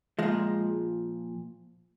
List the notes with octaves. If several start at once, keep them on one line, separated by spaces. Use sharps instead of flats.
A#2 F3 G#3